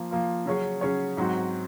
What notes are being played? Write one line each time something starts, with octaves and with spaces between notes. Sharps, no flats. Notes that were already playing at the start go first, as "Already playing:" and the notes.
Already playing: F3 A#3 F4
F3 A#3 F4
C#3 F#3 C#4 G#4 C#5
C#3 F#3 C#4 G#4 C#5
G#2 F#3 C4 F#4